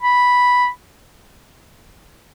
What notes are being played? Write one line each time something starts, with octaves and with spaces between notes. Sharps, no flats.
B5